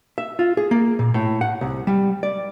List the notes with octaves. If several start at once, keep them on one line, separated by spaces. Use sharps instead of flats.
E5
F4
G#4
A#3
A#2
A2
F#5
C2
G3
D5